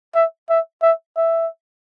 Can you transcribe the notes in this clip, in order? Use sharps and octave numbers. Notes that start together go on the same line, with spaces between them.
E5
E5
E5
E5